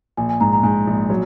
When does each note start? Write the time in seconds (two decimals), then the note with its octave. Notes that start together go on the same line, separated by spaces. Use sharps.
0.17 A#1 G#5
0.29 G#5
0.41 G#2 A#5
0.53 A#5
0.63 G#2 G#5
0.87 A#1
1.10 F#3